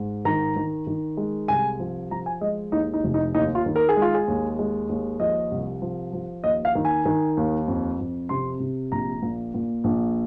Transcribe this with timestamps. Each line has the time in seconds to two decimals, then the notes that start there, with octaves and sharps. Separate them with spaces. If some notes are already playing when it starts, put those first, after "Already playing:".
Already playing: G#2 G#3
0.25 D#3 A#5
0.56 D#3
0.87 D#3
1.17 G#3
1.48 C2 G#5
1.80 F3
2.11 F3 A#5
2.26 G#5
2.41 G#3 D#5
2.72 D#2 D#4
2.94 D#4
3.04 F1
3.14 D#4
3.34 D#2 D#4
3.55 F4
3.66 D#3
3.76 A#4
3.89 G#4
3.96 G#3
4.02 F4
4.14 G#4
4.28 D#2
4.59 G#3
4.89 D#2
5.20 F3 D#5
5.51 C2
5.82 F3
6.13 F3
6.44 D#2 D#5
6.65 F5
6.75 D#3
6.85 G#5
7.06 D#3
7.37 D#2
7.68 F2
7.99 F2
8.29 C3 C6
8.60 C3
8.92 A#1 A#5
9.22 A#2
9.54 A#2
9.84 A#1